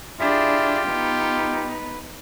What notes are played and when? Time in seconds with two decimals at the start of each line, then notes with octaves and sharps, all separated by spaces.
0.20 D4 E4 F4 G4 G#4 E5
0.88 B3 D#4 B4